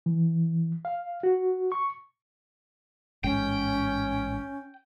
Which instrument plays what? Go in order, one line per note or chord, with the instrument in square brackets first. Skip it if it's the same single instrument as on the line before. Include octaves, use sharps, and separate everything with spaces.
[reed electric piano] E3
F5
F#4
C#6
[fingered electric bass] A1 G#2 G#3 [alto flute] C#4 [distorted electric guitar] G5